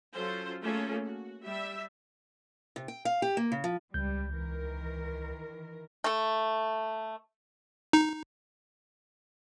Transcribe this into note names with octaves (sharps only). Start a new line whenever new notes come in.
F#3 C#4 F4 A4 C5
A3 A#3 C#4 F4 G#4 A4
F#4
G3 E5
C3
G5
F5
G4
A#3
C#3
F3
C#2 G3 G6
D#3 E3 A#4
A3 A4
D#4